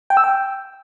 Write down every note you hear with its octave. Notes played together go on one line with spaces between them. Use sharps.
G5
E6
G5